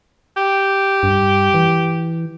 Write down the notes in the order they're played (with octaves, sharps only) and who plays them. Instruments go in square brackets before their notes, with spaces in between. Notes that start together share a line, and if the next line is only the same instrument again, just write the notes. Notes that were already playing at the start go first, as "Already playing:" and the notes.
[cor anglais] G4
[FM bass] G2
E3